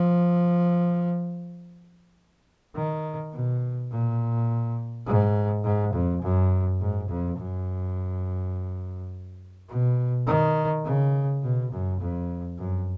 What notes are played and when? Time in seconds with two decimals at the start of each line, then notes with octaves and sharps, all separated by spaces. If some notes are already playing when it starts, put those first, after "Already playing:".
Already playing: F3
2.75 D#3
3.33 B2
3.91 A#2
5.07 G#2
5.64 G#2
5.94 F2
6.22 F#2
6.80 G#2
7.09 F2
7.38 F#2
9.69 B2
10.27 D#3
10.85 C#3
11.43 B2
11.72 F#2
12.00 F2
12.59 F#2